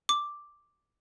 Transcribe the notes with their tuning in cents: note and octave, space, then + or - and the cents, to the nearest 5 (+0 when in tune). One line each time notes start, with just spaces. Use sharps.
D6 +0